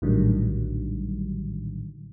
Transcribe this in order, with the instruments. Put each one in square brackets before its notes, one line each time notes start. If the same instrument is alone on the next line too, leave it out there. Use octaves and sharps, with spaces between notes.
[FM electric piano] A#1 A2 D3 D#3 F#3 G3